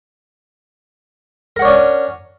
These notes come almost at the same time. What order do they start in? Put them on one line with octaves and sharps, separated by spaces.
A#4 F#5 C#5 D4 C#4